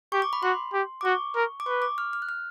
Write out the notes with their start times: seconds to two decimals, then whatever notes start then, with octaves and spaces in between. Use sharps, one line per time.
0.12 G4 C#6
0.22 D6
0.33 B5
0.43 F#4 C6
0.73 G4
1.01 D6
1.05 F#4 C#6
1.36 A#4
1.60 D6
1.66 B4 C#6
1.82 D6
1.98 F6
2.13 F6
2.22 F#6
2.29 F6